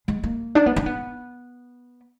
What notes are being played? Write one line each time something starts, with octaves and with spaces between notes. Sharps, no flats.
G#3
A#3
D4
B3
D4
B3